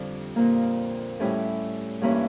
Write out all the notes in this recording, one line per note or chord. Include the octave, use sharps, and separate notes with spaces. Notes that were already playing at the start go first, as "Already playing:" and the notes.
Already playing: F2 D3 G3
A#2 F3 A#3
A2 G3 C#4 E4
G2 E3 A#3 C#4 E4